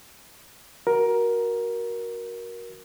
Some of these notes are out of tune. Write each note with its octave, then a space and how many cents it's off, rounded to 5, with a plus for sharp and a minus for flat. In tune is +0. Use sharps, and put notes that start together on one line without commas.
F#4 +5 A#4 +15